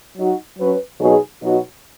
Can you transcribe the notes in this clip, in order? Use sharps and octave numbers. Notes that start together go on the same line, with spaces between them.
F#3 D#4 F#4
F#3 C#4 B4
B2 F#3 D#4 G#4
B2 F#3 D#4 F#4